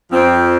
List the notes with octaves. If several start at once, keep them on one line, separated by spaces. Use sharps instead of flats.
F2 F3 C4